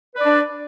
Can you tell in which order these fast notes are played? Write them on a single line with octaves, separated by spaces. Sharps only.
B4 D5 D4